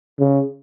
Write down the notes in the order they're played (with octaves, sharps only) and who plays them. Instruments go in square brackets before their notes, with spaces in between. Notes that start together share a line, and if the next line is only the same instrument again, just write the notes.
[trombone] C#3